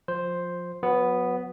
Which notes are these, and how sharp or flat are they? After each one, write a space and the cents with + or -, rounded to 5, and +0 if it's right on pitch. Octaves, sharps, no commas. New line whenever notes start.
F3 +20 C5 +0
F#3 -35 B3 +0